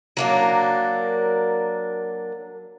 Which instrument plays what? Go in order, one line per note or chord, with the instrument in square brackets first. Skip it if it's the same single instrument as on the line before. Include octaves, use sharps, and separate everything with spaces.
[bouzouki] F#3 A#3 D4